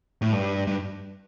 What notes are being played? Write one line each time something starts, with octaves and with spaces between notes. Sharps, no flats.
A2
G2
G2